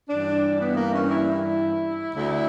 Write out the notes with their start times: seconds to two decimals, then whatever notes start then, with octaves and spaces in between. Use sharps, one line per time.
0.09 G2 E3 D4
0.60 B3
0.77 A#3
0.94 C#4
1.11 E4
2.12 D2 D3